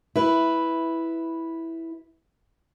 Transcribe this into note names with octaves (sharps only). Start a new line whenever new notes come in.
E4 B4